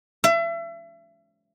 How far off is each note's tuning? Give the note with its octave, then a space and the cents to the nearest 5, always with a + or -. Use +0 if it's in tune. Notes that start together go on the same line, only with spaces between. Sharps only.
E5 +35